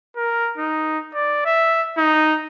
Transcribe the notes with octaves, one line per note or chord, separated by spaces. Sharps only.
A#4
D#4
D5
E5
D#4